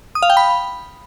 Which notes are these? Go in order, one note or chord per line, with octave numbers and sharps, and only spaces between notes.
D#6
F5
G5
B5